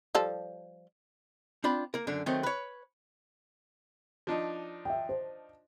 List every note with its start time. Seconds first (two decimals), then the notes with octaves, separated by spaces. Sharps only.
0.15 F3 G3 A4
1.64 C4 D4 F4 B5
1.94 A#3 A#4
2.07 F#2 D3 D4
2.26 D#3 F#3 A3 C4
2.43 B4 C#5
4.27 F3 D4 D#4
4.85 E5 G5
5.09 C5